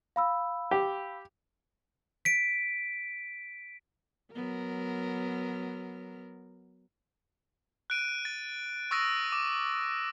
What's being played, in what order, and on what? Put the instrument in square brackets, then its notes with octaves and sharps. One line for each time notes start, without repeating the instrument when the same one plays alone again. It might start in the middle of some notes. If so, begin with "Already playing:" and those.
[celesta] F5 B5 E6
[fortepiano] G4
[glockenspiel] B6 D7
[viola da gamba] F#3 B3 A#4
[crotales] F#6 D7 D#7
A6
C#6 D#6 E6 A6 A#6 D7
D6